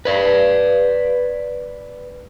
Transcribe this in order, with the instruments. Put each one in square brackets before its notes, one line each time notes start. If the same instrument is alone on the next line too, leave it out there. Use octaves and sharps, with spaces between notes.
[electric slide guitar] B4 D5